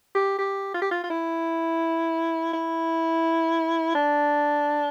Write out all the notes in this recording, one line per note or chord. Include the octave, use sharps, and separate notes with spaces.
G4
G4
F4
G4
F4
F4
E4
E4
D4